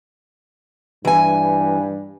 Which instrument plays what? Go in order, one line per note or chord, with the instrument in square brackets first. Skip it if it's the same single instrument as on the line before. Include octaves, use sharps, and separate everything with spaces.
[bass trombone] G2 [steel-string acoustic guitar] E3 G#5